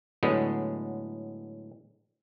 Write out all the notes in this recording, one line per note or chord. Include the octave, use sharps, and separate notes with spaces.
A2 D3 F#3 G#3 B3